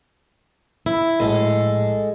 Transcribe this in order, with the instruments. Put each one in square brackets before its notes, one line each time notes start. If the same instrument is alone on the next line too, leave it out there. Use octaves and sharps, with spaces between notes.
[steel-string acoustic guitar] E4
[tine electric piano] A#1 A2 [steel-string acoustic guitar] G#3 A4